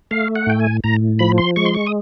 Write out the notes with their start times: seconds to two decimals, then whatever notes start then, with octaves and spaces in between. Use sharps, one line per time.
0.11 A3 F5
0.36 F#5
0.47 A2 G5
0.60 G#5
0.84 A2 A#5
1.19 F3 B5
1.38 C6
1.56 G#3 C#6
1.65 C6
1.75 C#6
1.86 D#6